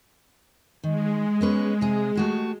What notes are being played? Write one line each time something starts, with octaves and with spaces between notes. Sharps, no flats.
D#3 G#3
B3 C#4 B4
C3 G#4
A3 F#4 G4